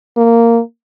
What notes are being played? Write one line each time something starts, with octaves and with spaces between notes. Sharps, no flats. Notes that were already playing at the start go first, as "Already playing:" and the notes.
A#3